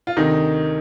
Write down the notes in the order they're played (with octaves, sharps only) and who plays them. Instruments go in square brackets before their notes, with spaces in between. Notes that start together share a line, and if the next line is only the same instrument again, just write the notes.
[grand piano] F4
D2 C3 D#3 D#4